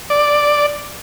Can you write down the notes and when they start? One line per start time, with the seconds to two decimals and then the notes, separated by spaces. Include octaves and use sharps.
0.10 D5